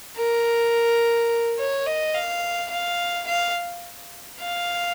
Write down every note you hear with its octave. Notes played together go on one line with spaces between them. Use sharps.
A#4
C#5
D#5
F5
F5
F5
F5